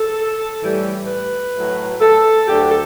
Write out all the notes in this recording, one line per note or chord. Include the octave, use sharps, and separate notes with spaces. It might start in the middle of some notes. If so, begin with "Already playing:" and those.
Already playing: A4
A2 E3 G3
B4
A2 F#3
A4
D2 D3 F#3 G4
A4